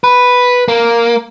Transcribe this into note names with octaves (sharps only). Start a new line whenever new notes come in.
B4
A#3